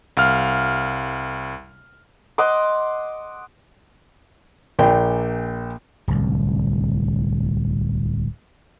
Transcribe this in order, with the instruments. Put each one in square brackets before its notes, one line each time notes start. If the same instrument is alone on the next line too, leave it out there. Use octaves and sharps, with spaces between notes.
[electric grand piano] C2 F5 F6
[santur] D#5 F#5 C6 D6
[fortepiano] A#1 A#2 G5
[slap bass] D1 C2